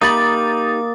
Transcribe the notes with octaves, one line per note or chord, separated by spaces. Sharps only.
A#3 D#4 G4 B5 D#6 A6